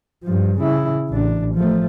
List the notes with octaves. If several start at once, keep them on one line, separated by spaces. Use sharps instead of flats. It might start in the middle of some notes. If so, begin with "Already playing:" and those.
G2 F3
C#3 E4
A1 D4
F3 A3